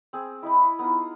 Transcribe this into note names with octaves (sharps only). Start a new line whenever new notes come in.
C4 G#4
E4 D#5 B5
B3 D#4 F4